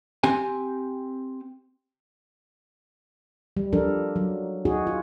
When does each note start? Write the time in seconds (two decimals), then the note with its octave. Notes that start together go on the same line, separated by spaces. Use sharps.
0.23 C4 G4 G#5
3.57 G3
3.73 F3 G3 D4 A4 A#4
4.16 F#3
4.65 D#4 F#4 G#4
4.87 F4